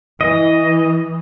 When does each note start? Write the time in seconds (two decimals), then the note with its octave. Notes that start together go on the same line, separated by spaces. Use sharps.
0.21 E3 D#5